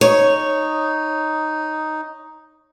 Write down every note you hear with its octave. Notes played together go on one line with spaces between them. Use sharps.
D#4 C#5